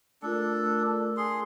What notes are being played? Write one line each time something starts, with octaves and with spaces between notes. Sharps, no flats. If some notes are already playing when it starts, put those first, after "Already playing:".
A3 D4 F4 A4 A#4
G#4 C6